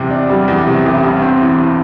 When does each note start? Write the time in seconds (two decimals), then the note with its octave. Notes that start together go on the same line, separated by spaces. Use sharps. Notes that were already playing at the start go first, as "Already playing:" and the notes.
Already playing: E2 C3
0.10 D4
0.30 G3
0.48 E2
0.67 C3
0.86 A1
1.03 G2
1.22 C4
1.41 E3